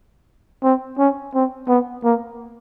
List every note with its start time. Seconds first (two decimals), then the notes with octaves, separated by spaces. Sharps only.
0.63 C4
0.99 C#4
1.34 C4
1.68 B3
2.04 A#3